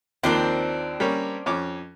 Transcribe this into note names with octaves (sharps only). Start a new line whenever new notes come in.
D#2 F3 A#3 C4 D4 C5
G3 A#3 C#4
F2 C#4 D6